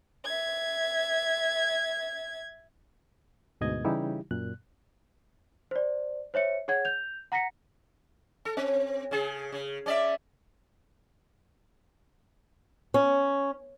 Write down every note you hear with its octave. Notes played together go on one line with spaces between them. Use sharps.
E5 G#6
D2 G#2 B2 D#5 G#6
C#3 E3 G3 D#4 E4 G4
F#2 A#2 F#6
C5 D5
C5 C#5 E5 C#7
G#4 C#5 F#5 G#6
G6 F7
F#5 A#5 A#6 B6 C#7
A4
C4
C#3 G#4
C#3
C#4 D5 E5
C#4